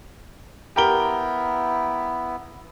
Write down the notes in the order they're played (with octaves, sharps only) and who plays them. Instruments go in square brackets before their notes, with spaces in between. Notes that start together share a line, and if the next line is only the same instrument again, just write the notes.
[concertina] B3 E4 [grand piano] G4 A#4 G7